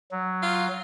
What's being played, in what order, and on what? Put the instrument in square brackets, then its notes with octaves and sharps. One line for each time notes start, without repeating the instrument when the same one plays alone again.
[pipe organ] F#3
[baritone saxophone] F4